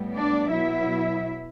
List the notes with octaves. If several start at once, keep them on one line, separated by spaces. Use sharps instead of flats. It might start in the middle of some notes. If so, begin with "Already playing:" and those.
Already playing: A2 G3 B3
D4 D5
B2 F#3 B3 E4 E5